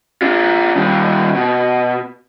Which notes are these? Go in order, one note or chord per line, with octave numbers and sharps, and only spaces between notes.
D4 F4
D#3 G3
B2